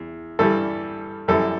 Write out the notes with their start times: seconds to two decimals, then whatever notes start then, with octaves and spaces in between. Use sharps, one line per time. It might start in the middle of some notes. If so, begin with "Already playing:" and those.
Already playing: E2
0.39 G2 E3 G3 A4
1.28 F#2 E3 G3 A4